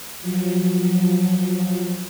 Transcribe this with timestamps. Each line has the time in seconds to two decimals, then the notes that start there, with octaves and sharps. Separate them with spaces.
0.21 F3 F#3